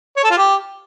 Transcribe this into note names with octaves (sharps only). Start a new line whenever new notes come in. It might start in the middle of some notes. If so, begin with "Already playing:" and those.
C#5
A4
F4
G4